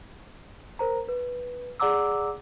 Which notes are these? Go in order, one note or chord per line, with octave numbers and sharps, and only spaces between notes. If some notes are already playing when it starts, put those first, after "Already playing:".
A#4 C5 A#5
B4
G#4 D5 F#5 A#5 D6 E6